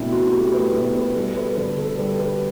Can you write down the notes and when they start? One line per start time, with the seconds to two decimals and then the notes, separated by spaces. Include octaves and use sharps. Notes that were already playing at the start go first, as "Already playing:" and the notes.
Already playing: B2 A3 C4 D4 E4
0.12 F#4
0.27 F#4
0.33 A3 G4
0.54 B4
0.74 B2 B4
0.95 B4
1.16 G3 A4
1.36 B4
1.57 D3 B4
1.78 A4
1.99 G3 B4
2.20 B4